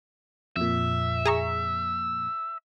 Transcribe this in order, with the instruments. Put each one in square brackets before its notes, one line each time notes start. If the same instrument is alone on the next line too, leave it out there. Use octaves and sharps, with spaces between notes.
[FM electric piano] F2 A#2 [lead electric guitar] E5
[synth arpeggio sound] G#4 A#5 C#6